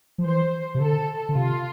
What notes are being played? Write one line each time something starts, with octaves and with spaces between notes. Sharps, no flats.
F3
E3 C5
C3
D3 A4
D3
C3 F4